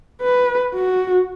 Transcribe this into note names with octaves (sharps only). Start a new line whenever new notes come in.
B4
F#4